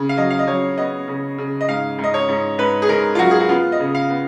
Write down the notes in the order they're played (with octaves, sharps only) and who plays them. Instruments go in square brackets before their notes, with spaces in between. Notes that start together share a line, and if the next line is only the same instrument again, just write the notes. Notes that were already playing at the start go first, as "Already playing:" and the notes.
Already playing: [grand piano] C#3
F5
F#3 D#5
F5
D#5
F#3 C#5
B3 D#5
C#3
C#3
D#5
G#2 F5
G#2
D#5
C#5
G#2
G#2 B4
G#4
G#2 A#4
F4
F#3 F#4
G#4
F#4
B3 F4
D#5
C#3
F5
B3